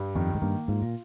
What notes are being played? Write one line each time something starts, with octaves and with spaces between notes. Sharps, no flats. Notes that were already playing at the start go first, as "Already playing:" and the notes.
Already playing: G2
F2 D#3
G#2
G2 A#3
G#2 F4
A#2